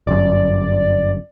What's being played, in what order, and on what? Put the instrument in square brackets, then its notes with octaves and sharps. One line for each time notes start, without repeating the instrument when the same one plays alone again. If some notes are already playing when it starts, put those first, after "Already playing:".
[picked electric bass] G1 F#2 [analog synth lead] D5